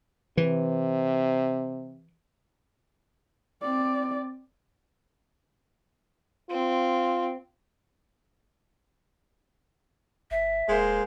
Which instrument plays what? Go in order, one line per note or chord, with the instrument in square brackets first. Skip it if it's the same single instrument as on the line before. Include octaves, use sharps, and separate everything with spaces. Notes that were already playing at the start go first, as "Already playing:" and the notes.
[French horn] C3 [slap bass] E3
[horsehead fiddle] C4 D5
[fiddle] C4 [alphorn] F4
[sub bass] G1 [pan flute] E5
[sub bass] D#1 [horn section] G#3 A#3 C5